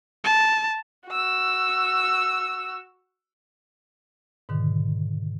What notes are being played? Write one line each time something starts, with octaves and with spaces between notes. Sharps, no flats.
A5
F#4 E6
G#2 B2 D3 D#3